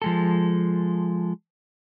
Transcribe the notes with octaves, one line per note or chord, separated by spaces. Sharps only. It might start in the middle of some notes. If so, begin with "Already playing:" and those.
F3 G#3 A4